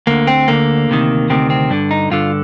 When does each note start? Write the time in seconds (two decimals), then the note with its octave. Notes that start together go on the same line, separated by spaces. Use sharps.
0.07 D2 D3 A#3
0.27 C4
0.48 D2 D3 A#3
0.89 D2 C3 D#3
1.30 D2 C3 D#3 C4
1.50 C4
1.70 G2 D3 D4
1.91 D#4
2.11 G2 D3 F4